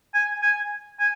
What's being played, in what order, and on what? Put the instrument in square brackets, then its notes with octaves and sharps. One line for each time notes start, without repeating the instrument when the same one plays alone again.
[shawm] G#5
G#5
G#5